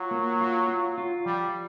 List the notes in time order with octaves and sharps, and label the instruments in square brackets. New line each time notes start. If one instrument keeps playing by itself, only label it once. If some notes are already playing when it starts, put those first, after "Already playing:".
Already playing: [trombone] F#3 [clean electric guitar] F4
[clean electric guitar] A#3
F4
F4
F4
[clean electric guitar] F3 [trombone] G3